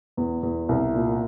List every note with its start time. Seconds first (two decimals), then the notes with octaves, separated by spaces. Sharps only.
0.17 E2
0.43 E2
0.69 C2
0.95 A#2